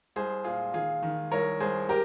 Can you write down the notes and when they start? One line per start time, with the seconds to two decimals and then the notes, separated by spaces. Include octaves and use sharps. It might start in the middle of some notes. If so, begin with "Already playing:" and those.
0.16 C2 G#4 C5
0.44 A#2 F4 G#4
0.74 D#3 F4 G#4
1.02 D#3
1.31 C2 A#4 C#5
1.60 C2 G#4 C5
1.89 G4 A#4